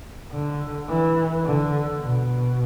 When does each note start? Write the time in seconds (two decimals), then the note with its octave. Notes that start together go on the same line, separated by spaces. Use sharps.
0.32 D3
0.88 E3
1.45 D3
2.00 B2